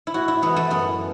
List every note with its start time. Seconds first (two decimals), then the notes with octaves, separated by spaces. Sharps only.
0.07 E4
0.14 A2 F#4
0.28 E4
0.42 E3 G#3 B3
0.56 A3
0.70 F#2 B3